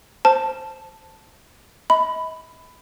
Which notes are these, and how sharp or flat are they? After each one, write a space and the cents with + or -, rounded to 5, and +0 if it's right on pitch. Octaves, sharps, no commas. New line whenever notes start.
C5 +0 A5 +0
D#5 +40 B5 +15